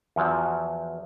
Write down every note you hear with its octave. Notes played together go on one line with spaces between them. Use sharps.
E2 F3 F#3